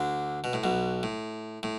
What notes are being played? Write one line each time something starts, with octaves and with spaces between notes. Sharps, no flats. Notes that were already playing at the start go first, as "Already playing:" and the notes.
Already playing: D2 D3
B2
A2
B1 B2
A2
A2